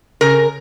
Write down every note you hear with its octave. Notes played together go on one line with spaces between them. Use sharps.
C#3 A#4